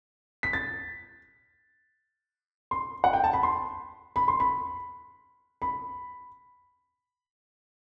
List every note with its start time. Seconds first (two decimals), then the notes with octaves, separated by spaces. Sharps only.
0.43 B6
0.53 A6
2.71 C6
3.04 F#5
3.13 G5
3.24 A5
3.33 B5
3.43 C6
4.16 B5
4.28 C6
4.40 B5
5.62 B5